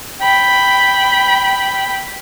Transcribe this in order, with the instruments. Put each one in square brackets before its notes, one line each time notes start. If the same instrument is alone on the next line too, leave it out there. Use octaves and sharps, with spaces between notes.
[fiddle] G5 B5